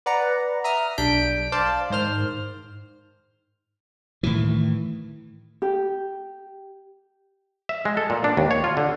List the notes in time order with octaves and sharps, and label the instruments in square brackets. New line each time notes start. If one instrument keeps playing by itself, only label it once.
[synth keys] B4 D5 F#5 A#5
E5 A#5 D#6 F6
B1 G3 D4 G6 B6 D7
C5 D5 F5 A5
G#2 D#3 C5 F6
[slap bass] A2 D#3 E3
[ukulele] G4
[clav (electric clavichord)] E5
G#3
A4
A#2
D4
D#2
C#5
F4
D3